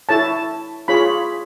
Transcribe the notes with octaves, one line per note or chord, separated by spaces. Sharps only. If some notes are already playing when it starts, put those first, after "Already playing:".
E4 A4 C#5 A5
F4 G#4 C#5 B5